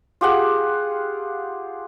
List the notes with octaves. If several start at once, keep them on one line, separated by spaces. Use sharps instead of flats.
F4 G4 G#4 F#5